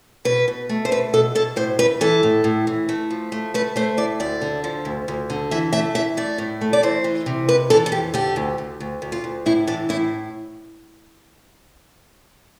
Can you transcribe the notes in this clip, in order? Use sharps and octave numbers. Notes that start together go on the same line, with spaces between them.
B2 B4
B2
A3
C5
B2 B4
B2 A4
B2 A4
A2 C5
A2 B4
E3 A4
A2
A2
E3
A3
F3
A3
A3 B4
A3 C5
A2 D5
D2 D5
D3
F3
D2
D2
D3
E3 E5
A3 E5
E3 E5
A3 D5
A2
A3
D5
E3 C5
E3
C3
F2 B4
E3 A4
A4
F2 G4
D3 G4
D2
D2
D2
D2
F4
D2
A2 E4
E3 D4
A2 E4